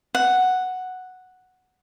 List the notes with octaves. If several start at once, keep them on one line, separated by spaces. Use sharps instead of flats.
F#5